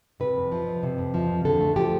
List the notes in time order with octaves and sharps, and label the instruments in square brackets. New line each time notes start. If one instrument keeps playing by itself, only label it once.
[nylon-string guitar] C3 B4
F2
F3
F2
C3
F2
F3
F2
D3 A4
A3
F3 G4